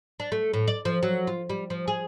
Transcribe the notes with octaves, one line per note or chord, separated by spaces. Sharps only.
D4
A3
A2
D5
F3
F#3
F4
G3
F3
G#4